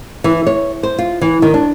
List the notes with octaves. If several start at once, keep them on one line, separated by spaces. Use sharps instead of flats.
E3
C#5
C5
F4
E3
D#3
D4